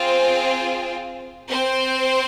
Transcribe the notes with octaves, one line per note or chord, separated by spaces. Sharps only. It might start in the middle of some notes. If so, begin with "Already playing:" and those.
Already playing: C4 F4 G#4 C5
C4 C5